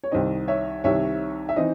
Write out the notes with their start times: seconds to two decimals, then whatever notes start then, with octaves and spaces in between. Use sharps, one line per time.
0.04 C#5
0.11 C2 C3 D#3 C5 D#5
0.48 C#5 E5
0.84 C2 C3 D#3 C#5 E5
1.49 E5
1.56 E3 C4 D#4 C5 D#5